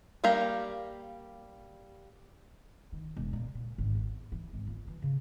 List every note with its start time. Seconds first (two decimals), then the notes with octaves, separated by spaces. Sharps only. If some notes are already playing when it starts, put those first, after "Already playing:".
0.24 G3 A#3 G4 F5 A#5
2.92 D#3
3.17 E1
3.33 A#2
3.55 A#2
3.78 G#1
3.95 E2
4.32 E3
4.53 G#1
4.67 F4
4.87 E3
5.02 C#3